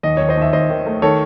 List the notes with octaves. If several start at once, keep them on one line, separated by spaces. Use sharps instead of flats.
D#2 D#5
D#2 C#5
C5 D#5
D#2 E5
D#2 C5 D#5
D#3
A3
D#3 A4 C#5